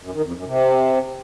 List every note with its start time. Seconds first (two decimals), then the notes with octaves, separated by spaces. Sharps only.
0.02 F#2
0.13 D#3
0.24 F2
0.35 F#2
0.46 C3